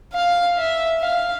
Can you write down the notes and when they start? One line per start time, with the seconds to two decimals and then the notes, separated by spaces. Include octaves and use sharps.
0.14 F5
0.57 E5
1.01 F5